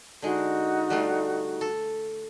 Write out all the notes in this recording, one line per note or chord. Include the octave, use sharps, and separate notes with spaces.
D3 G#3 D#4 F#4
G3 A3 F4
A4